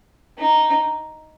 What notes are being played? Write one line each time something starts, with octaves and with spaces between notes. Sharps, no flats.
D#4